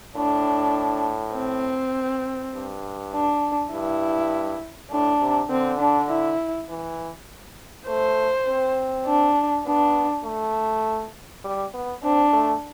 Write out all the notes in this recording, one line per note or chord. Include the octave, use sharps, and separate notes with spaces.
A2 D4
C4
G2
D4
G2 E4
A2 D4
C3
D3 C4
D4
E4
E3
A3 C5
C4
D4
B3 D4
A3
G3
B3
C4 D4
A3